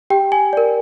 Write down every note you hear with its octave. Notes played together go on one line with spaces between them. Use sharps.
G4 G5
G#5
A#4 D5